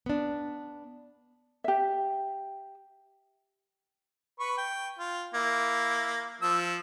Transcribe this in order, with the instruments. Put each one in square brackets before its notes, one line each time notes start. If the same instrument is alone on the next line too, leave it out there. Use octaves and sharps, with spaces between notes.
[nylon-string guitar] B3 D4
[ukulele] G4 E5
[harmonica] B4 C#6
G5
F4
A#3 E4
F3 E6